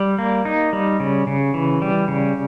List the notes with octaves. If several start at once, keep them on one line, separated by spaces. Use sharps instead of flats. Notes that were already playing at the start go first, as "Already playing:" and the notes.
Already playing: G3
A#3
D#4
G3
C#3
C#3
E3
G3
C#3